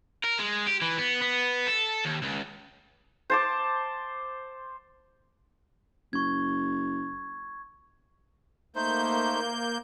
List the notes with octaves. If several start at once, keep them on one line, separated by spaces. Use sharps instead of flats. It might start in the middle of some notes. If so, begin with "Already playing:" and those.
A#4
G#3
G4
E3
B3
B3
A4
D#2
C#2
C5 A5 D6
F#1 C#6 G#6
A3 A#3 D#4 C5 G6